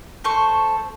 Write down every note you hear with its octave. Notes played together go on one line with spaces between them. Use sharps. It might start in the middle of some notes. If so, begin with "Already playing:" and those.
A4 C5 C#6